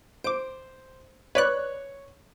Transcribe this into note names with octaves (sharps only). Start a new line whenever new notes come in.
C5 D6 D7
B4 C#5 D5 F#6